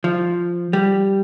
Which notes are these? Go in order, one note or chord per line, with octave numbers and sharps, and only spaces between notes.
F3
G3